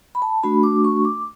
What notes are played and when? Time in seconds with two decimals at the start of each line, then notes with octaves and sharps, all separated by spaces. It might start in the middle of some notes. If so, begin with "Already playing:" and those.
0.15 B5
0.22 A5
0.43 A3 D4 F#4 B5
0.63 D6
0.84 C#6
1.05 D6